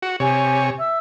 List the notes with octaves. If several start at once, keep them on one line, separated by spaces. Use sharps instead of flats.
F#4
C3 G4 C#5 G#5
E5 E6